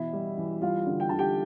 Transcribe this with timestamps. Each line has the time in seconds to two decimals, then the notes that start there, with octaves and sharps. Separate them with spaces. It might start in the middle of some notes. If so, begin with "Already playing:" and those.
Already playing: B2 E3 E4 E5
0.13 G3
0.37 E3
0.62 G3 F4 F5
0.87 D3
1.00 G5
1.09 D3 A5
1.19 G4 G5